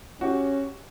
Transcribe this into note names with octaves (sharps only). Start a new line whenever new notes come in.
C#4 F#4 G4